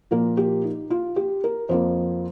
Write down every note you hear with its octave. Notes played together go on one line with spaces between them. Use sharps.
A#2 F3 A#3 A#4
G4
D#4
F4
G4
A#4
F2 F3 A#3 C5